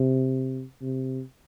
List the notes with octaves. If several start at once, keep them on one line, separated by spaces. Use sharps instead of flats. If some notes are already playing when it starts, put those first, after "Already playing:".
Already playing: C3
C3